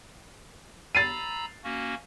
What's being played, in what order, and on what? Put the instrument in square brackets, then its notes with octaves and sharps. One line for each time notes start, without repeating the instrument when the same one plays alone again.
[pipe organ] A#5 B5 E6 [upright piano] A6 C7 D#7
[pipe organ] A#3 C#4 F#4